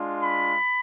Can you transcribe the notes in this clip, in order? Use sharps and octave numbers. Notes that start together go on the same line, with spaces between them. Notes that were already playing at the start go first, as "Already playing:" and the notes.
Already playing: G#3 D4 F4
B5